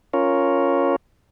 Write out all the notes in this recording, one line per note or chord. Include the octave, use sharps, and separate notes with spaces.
C#4 F4 A#4 C#5